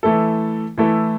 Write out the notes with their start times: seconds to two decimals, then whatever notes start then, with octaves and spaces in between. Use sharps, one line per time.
0.03 E3 A3 E4 A4
0.78 E3 A3 E4 A4